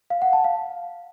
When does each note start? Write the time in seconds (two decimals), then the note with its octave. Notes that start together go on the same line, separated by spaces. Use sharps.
0.10 F5
0.22 F#5
0.33 A5
0.44 F5